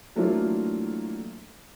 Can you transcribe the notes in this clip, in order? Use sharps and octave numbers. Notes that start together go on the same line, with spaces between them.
E3 F#3 A3 A#3 D4 F4